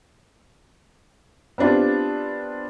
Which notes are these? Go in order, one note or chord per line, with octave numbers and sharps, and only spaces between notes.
B3 C4 D4 F4 G4